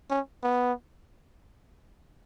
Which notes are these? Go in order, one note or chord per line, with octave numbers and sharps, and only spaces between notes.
C#4
B3